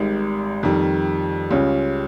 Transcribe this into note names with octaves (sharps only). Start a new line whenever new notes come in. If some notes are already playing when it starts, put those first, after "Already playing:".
Already playing: G#1 G#2 G3
F2 D#3 G3
C#2 C#3 G3 C#4 F4